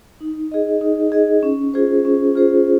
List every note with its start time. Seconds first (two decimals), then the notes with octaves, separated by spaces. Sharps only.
0.21 D#4
0.52 G#4 D#5
0.81 D#4
1.12 G#4 D#5
1.43 C#4
1.74 F4 G#4 C5
2.05 C#4
2.35 F4 G#4 C5